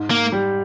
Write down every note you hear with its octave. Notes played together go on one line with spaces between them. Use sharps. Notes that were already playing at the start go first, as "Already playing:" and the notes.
Already playing: G#2
A#3
G3